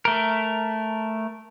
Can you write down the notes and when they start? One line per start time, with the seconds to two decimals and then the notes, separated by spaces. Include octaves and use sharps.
0.05 A3 A#4